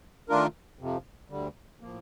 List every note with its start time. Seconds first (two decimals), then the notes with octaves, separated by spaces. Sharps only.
0.29 D#3 A3 D4 F4 A#4
0.79 F2 C3 F3
1.30 D2 D3 G3
1.81 A2 F3 A#3